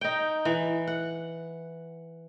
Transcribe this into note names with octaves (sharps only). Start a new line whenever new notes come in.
D#4 G5
E3
F#5